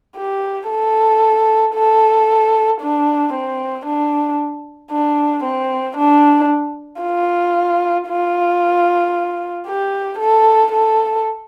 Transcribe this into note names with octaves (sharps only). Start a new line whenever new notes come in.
G4
A4
A4
D4
C4
D4
D4
C4
D4
F4
F4
G4
A4
A4